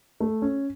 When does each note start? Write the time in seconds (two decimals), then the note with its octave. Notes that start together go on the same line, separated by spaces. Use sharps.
0.20 A3
0.42 C#4